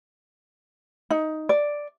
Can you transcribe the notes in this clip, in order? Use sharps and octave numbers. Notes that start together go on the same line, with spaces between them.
D#4
D5